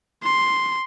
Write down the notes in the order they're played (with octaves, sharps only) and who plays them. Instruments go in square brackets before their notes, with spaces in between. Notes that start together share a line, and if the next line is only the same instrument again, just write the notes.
[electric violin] C6